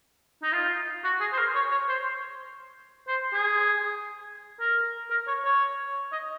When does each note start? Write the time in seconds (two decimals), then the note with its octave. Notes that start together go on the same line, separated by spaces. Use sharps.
0.43 D#4
0.53 F4
1.04 F#4
1.21 G#4
1.33 C5
1.38 A#4
1.55 C#5
1.71 C#5
1.89 C5
3.08 C5
3.33 G#4
4.60 A#4
5.11 A#4
5.28 C#5
5.45 C#5
6.12 D#5